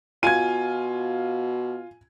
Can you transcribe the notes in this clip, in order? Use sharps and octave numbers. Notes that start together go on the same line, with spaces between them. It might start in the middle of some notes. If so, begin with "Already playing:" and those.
B2 F4 G#5 G#6 D#7